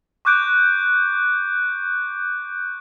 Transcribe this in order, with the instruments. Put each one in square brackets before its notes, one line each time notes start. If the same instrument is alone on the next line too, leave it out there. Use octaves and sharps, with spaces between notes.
[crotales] C#6 D6 F#6 G6 D7